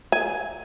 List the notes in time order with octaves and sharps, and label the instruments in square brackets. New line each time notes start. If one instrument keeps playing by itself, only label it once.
[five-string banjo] G#5